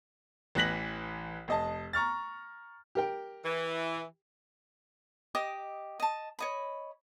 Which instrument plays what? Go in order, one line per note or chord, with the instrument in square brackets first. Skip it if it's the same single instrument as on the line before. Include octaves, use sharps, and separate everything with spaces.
[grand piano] A1 E3 F#6 A#6 B6 F#7
F1 D#5 A5
A#5 C#6 F6 A6
[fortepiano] G4 A#4 G5
[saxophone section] E3
[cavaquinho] G4 D#5 D6 D#6
D#5 A5
C#5 D#5 B5